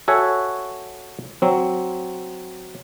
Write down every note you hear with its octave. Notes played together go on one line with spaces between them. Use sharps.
F#4 A4 C#5 E5 F#5 G#5
F#3 C4